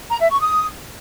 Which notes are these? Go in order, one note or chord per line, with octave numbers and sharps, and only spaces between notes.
A#5
E5
C#6
D#6